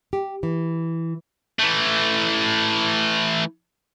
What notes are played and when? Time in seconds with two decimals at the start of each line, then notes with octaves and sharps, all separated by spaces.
0.13 G4
0.43 E3
1.59 E3 A3